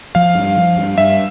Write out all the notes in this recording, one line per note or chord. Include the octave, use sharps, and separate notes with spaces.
F3 F5
G2
F3
G2
G2 E5